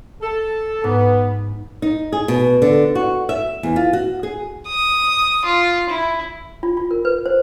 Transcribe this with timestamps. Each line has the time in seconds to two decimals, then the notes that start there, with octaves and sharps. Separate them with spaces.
0.21 A4
0.84 G#2 B3
1.82 D#4
2.12 G#4
2.28 B2
2.62 D3
2.95 F#4
3.29 E5
3.63 E2
3.76 F4
3.93 F#4
4.23 G#4
4.67 D#6
5.45 F4
5.89 E4
6.63 F4
6.77 F4
6.91 A#4
7.05 B4
7.26 C5